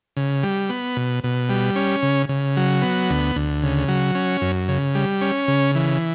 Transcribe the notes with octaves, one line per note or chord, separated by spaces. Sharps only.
C#3
G3
B3
B2
B2
G3
C#4
C#3
C#3
F#3
B3
D2
D2
C#3
F#3
C#4
F#2
C#3
G3
C#4
C#3
E3